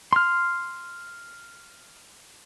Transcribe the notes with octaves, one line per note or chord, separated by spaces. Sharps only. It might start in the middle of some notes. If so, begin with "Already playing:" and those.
C6 F6